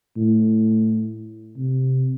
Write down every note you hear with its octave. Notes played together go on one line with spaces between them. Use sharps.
A2
C3